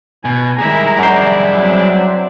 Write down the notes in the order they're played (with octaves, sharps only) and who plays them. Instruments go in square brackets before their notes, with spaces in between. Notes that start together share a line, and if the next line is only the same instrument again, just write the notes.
[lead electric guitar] B2 [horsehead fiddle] G#5
[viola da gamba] D#3 G#3 E4 [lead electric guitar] G3 G#4 [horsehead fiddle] A#5
[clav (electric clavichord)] F#2 C5 [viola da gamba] D4 E4 D5
[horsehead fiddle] F#3 C4